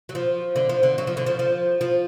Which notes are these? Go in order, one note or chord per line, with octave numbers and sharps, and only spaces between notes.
F#3
F3
D3
F3
D3
F#3
F3
D3
F3
F3
F3